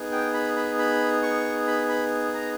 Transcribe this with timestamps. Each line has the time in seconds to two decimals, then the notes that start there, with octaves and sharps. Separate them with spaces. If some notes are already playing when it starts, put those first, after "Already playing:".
Already playing: B3 D#4 G#4
0.12 G5
0.34 B5
0.56 B5
0.79 B5
1.23 C#6
1.67 B5
1.89 B5
2.34 A#5